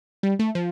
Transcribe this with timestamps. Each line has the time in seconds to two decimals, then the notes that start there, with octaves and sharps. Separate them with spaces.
0.23 G3
0.39 A3
0.55 F3